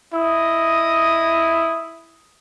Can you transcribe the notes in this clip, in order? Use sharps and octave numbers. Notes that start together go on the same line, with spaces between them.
E4 D#5 D#6